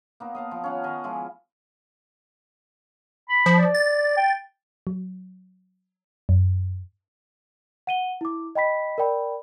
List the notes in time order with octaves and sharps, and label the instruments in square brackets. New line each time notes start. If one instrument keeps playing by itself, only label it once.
[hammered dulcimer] A#3 B3 D#4
D#5 F5 A5
F3
C#4 F5 F#5
D#3 D#5 G#5
F3 G#3 E4
[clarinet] B5
[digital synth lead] F3
[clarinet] D5
[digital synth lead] A6
[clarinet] G5
[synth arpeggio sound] F#3
F#2
[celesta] F#5 D#7 G7
E4 D6
D#5 G5 B5 B6
A#4 D5 G5 B5